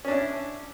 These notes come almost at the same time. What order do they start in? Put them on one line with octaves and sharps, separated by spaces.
C#4 D4 E4